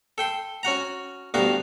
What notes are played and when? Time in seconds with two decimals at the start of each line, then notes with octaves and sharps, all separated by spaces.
0.18 A4 G5 C6
0.63 C#4 F#4 F#5 A#5
1.34 D2 G2 B3 F#4 F5 A#5